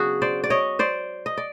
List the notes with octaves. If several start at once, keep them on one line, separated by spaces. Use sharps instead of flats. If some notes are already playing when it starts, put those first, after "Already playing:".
Already playing: C#3 F#3 B3 D4 F#4 G#4
C5 D5
D5
C#5 D#5
C5 D5
D#5
D5